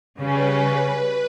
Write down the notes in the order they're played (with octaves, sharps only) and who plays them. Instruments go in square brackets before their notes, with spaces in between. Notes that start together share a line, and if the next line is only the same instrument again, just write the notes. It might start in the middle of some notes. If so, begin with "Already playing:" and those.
[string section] C#3 G3 C#4 [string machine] B4